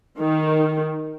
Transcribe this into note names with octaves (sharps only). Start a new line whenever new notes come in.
D#3